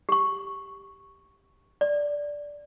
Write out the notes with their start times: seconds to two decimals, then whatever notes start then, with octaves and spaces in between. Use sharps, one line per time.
0.09 G4 C#6
1.81 D5